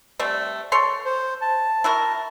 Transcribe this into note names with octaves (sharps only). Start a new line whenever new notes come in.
G3 A3 C4
A4 C#5 C6
C5
A5
E4 F#4 A#4